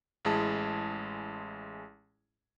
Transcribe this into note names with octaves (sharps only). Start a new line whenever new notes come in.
A1 G#3 E4 G#4 A5